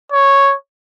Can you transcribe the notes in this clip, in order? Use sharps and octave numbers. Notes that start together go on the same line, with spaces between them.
C#5